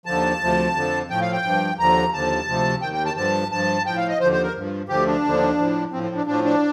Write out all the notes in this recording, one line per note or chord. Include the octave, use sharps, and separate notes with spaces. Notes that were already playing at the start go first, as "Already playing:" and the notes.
D#2 D3 F3 A5
D2 C3 F3
F2 D3 F3
A2 F3 G5
F5
G5
G2 F3
D#2 D3 F3 A#5
D#2 D3 F3 A5
D2 C3 F3
D#2 D#3 G5
G5
A5
G2 D3 F3 A5
G2 F3 A5
A2 F3 G5
F5
D#5
D#2 D3 F3 C5
C5
A#4
G2 F3
D2 D3 F3 G4
D4
D#2 D3 F3
A2 F3
A2 F3 C4
C4
D4
A2 F3 D4
D4